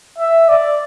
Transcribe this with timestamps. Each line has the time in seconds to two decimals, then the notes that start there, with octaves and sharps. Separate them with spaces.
0.18 E5
0.48 D5